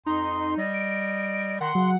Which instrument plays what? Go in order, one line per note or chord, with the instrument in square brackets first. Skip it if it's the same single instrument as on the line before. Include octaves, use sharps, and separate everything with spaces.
[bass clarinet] F2 [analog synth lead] D#4 [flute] C6
[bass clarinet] G3 [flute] D#5
[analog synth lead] D7
[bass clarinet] D#3 [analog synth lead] F#5 [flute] C6
[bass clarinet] C#3 [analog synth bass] F#3